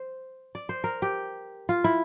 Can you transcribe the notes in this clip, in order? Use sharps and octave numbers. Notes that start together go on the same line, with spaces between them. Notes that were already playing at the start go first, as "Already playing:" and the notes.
Already playing: C5
D5
C5
A#4
G4
F4
E4